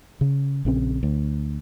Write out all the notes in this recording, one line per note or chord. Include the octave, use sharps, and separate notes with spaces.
C#3
A#1 C#3 C4
D2